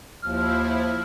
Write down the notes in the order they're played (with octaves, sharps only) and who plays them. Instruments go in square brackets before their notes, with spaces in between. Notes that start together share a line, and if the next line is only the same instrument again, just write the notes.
[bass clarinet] D#2 [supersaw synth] F3 E4 [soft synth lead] F6